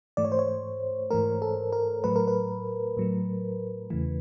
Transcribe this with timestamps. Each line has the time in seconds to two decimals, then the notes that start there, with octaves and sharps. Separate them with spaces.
0.17 G#2 E3 A3 D5
0.25 C#5
0.32 C5
0.39 C#5
1.11 G#2 E3 A3 A#4
1.42 A4
1.73 A#4
2.04 A2 F#3 A3 B4
2.16 A#4
2.28 B4
2.97 A2 F#3 A3
3.90 E2 C#3 E3 A3